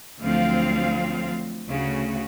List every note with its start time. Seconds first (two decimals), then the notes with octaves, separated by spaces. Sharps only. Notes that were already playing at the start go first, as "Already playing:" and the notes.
0.19 D2 F3 F#3 C4 F5
1.66 D2 C#3 F#4